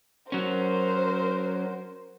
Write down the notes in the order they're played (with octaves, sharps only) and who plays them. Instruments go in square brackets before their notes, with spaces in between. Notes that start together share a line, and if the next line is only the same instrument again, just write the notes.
[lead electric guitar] F#3 C#4 [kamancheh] A#4 C5